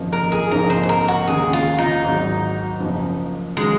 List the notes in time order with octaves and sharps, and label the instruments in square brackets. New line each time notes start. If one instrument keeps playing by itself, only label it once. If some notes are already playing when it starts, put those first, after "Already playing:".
Already playing: [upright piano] G#1 F#2 F3 A#3 D#4
[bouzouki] A#4
G#4
[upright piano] A#1 G#2 F3 C4 D#4 [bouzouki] A#4
[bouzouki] C5
C5
A#4
F#4
[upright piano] D#2 C#3 G#3 C#4 [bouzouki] G#4
[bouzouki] F4
D#4
[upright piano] G#1 G#2 F#3
F#1 F#2 F3
[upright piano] D#3 F#3 C#4 F4 [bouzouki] G#3